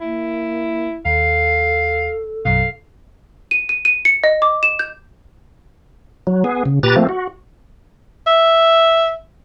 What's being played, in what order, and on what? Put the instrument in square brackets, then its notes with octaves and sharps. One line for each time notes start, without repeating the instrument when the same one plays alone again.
[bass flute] A#3 [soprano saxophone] E4
[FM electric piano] D#2 [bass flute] A4 [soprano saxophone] F5
[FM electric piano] A#1 F#2 B2 [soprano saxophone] F5
[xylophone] D#7
D#7
D#7
C#7
D#5
D6
E7
G6
[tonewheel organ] F#3
B3 G#4
C#3
A#2 G4 B4 A#5 A6
F3 A3 A#3 C4
F#4
[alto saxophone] E5